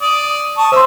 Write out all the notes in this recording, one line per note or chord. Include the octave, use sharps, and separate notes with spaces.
D5 D#6
A5 C#6 D#6
C5 E5 C6